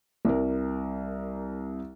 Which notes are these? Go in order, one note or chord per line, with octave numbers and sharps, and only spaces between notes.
C2 A#4